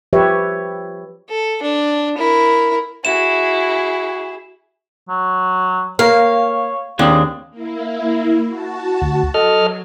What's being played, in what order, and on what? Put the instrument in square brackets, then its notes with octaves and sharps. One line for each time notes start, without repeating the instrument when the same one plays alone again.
[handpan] F3 G4 B4 C#5 E5
[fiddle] A4
D4
E4 A#4
[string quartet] E4 G#4 [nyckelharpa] F#4 [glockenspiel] E7
[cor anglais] F#3
[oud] A#3 [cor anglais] C#5 [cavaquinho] F5
[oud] D#2 [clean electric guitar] A#3 C4 D4 [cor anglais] G#4
[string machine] A#3 E4
F#4 A5
[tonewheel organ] D2
[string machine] F#3 [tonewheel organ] A4 D#5 F6